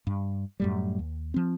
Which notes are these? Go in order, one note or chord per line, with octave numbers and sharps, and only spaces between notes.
G2
F#2 A2 G3
D#2
F3 C4